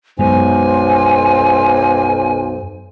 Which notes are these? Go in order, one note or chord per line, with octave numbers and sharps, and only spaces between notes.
B1 F#2 G#3 B3 C5 G#5